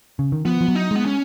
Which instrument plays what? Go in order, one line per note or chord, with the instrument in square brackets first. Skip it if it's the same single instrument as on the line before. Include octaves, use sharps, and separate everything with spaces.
[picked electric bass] C#3
D#3
[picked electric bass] F3 [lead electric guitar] B3
[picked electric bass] F3
F#3
[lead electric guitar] D#4
[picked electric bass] G#3 [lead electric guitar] B3
[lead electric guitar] C#4